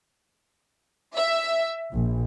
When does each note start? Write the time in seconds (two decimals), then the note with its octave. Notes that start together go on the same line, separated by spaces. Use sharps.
1.16 E5
1.93 A#1